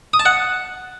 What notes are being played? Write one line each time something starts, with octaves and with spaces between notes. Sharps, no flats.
D#6
A5
F#5